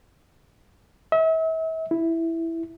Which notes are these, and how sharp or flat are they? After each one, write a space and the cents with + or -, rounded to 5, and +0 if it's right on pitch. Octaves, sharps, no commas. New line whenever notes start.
E5 -40
E4 +0